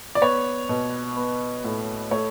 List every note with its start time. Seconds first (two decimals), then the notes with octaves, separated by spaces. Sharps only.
0.15 D5
0.22 B3 C#5
0.69 B2
1.16 B3
1.64 A2
2.11 A3 C#5